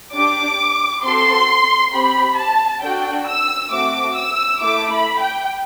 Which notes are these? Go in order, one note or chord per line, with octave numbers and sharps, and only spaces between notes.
D4 G4 D6
C4 F#4 A4 C6
C4 G4 B5
A5
D4 F#4 A4 G5
E6
A3 C4 F#4 D6
E6
A3 E4 A4 D6
B5
G5